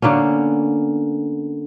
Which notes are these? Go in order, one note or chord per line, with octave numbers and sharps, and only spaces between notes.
D3 A#3 B3 C#4